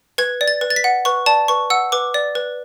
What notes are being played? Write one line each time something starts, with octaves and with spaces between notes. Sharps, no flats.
B4 G#6
D5
A6
B4
A6
B6
F#5
B4 C#6
D5 A5
B4 C#6
F#5 E6
B4 D6
D5
B4